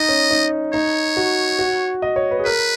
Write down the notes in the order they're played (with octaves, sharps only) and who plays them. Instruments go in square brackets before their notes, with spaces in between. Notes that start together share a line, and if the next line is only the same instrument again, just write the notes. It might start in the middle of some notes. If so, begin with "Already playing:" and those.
Already playing: [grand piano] D#4 [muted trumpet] D#5
[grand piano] C#4
D#4
[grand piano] D#4 [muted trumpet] C#5
[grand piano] F#4
F#4
D#5
C#5
B4
G#4
[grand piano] A#4 [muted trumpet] B4